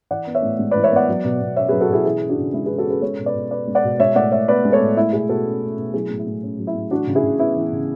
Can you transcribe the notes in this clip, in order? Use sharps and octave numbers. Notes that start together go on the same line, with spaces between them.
E3 D5 F#5
B3
C#5 E5
A2
G#3
B4 D5
E3
C#5 E5
B3 D5 F#5
F#3
B2
B2
C#4 C#5 E5
G#4 B4
F#3
F#4 A4
B2 E4 G#4
E3 E4 G#4
C#4
D4 F#4
C#3
G#3 E4
G#4 B4
E3
F#4 A4
C#4 G#4 B4
G#3 A4 C#5
B2
B4 D5
B2
B3 B4 D5
G#3
D5 F#5
B2
G#3 C#5 E5
A2 D5 F#5
A2 C#5 E5
B3 B4 D5
G#3
A4 C#5
A2
A3 E4
B2 E4 G#4
B2 F#4 A4
C#4
A3
B2
F#3 E4 G#4
A2
E4
A2
C#4
F#3
E4
A2
E3 D4 F#4
C#3
E4 G#4
C#3
B3 E4
E3
C#3